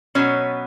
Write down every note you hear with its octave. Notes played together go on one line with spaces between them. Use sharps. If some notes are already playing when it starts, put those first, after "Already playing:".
B2 F#3 B3 C#4